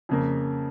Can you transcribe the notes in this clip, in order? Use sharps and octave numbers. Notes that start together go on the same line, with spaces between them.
F2 C#3 A#3